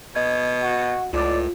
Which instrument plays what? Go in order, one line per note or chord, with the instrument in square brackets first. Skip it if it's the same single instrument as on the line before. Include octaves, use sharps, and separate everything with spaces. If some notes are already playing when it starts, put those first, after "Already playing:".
[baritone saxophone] B2 [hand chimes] D#5 G#6
[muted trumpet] F#4
[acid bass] C#2 [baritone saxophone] A2 [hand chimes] F4 [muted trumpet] D5